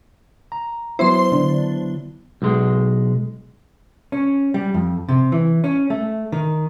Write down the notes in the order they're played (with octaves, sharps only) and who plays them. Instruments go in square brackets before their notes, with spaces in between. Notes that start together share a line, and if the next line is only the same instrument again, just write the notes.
[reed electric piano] A#5
[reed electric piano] F#3 B3 E4 [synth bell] C5 C6
[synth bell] D3
[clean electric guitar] B1 G#3
[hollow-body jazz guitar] C#4
G3
F2
C3
E3
C#4
A3
D#3